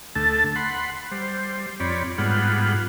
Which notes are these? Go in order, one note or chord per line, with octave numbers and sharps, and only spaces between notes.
D2 A3 A4 A5
F#5 B5 C6
G3 C5
F2 C4 C#5 D5 B5
G#2 G3 B3 F4 F#5